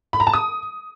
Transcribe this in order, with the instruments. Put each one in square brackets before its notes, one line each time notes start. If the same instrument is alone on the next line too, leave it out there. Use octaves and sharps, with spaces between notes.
[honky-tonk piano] B5
A#5
A5
D#6